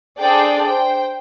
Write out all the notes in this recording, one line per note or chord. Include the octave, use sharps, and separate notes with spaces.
D4 G#4 A4 C5 D5 G5
C5 G5